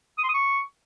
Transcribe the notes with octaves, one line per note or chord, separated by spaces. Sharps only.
D#6
C6
D#6
C#6